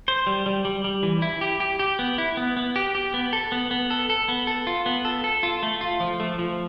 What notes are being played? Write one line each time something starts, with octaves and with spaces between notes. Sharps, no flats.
C5
G3
G3
G3
G3
E3
E4
G4
G4
G4
B3
E4
B3
B3
G4
G4
B3
A4
B3
B3
A4
A4
B3
A4
F4
B3
A4
A4
F4
A3
F4
F3
A3
F3